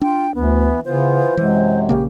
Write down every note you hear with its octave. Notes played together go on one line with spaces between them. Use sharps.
D4 F4 G5
D2 E3 B3
C#3 E3 B3 F4 C5
F#2 C3 E3 F#3 G#3
A#1 C#3 A#3 G4